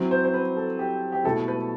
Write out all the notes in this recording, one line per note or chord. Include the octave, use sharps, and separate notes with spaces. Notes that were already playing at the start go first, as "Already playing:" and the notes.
Already playing: F#3 C4 E4
C5
C5
B4
A4
G4
G4
B2 A3 E4 A4
B4